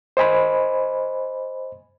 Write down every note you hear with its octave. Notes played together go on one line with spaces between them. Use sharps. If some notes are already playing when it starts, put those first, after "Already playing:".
C5 D#5 G#5 B5